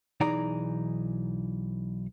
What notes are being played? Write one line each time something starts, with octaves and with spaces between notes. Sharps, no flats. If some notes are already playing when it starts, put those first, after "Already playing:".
B1 E3 D#4 G#4 D5 A#5